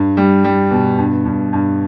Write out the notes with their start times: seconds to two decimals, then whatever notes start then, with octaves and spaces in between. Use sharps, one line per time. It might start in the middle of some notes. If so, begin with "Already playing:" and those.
Already playing: G2
0.17 G3
0.44 G3
0.71 B2
0.98 G2
1.25 G2
1.53 G2